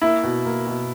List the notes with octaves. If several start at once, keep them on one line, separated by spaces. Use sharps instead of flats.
A#3 E4
B2
A#3
B2